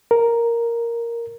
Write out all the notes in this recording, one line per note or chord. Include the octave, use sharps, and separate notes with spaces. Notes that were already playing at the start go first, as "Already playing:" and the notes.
A#4